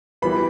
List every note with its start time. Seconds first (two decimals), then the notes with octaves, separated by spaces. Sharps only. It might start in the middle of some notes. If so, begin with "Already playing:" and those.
0.22 E3 G3 B3 B5